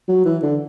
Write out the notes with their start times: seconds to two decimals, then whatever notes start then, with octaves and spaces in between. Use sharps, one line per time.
0.08 F#3
0.25 E3
0.43 D3